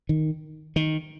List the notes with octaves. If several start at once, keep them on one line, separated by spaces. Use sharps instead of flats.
D#3
D#3